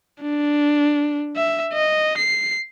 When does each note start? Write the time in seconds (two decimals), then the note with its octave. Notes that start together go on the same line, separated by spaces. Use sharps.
0.22 D4
1.36 E5
1.73 D#5
2.18 C7